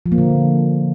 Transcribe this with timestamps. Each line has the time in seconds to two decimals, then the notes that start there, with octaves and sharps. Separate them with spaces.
0.06 F3
0.12 A#3
0.18 D3